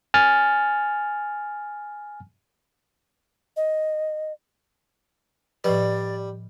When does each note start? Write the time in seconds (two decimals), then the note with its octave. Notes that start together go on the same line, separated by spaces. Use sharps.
0.14 G#5 F6 A6
3.57 D#5
5.64 A2 F3 G3 B4 D5 D#5